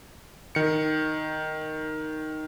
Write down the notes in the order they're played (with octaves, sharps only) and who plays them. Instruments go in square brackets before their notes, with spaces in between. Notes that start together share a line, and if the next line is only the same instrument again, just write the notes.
[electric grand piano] D#3 C#7